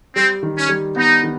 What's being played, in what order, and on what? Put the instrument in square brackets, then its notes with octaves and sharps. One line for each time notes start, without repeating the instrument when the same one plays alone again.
[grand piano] G3 [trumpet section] C4
[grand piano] D#3
[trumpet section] C#4
[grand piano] G3
[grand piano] B3 [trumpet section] D#4
[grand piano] D#3